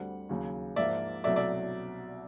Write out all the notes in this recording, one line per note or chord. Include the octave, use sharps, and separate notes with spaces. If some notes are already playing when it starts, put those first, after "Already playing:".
Already playing: D2 D3 G3 C4 F#5
D#2 C#3 F#3
G#2 F3 A#3 D5 E5
C2 B2 F#3 A3 D5 E5
D5 E5